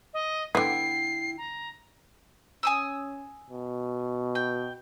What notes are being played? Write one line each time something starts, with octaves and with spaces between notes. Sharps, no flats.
D#5
D3 B3 E4 G5 C7
A#5
C#4 G#5 D#6 E6
B2
G5